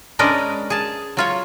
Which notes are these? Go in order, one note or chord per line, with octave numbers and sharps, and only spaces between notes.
G#3 C#4 D4 A#4 B4 D#5
G#4 A5
F#3 F4 C#5